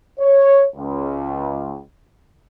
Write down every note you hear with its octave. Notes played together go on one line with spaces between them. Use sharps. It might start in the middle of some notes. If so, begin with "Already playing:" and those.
C#5
C#2